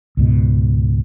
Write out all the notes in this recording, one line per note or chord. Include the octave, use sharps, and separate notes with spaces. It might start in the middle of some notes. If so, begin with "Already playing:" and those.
C#2 G#2 B2